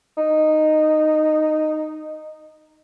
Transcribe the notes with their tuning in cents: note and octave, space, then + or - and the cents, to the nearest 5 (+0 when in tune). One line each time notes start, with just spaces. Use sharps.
D#4 -10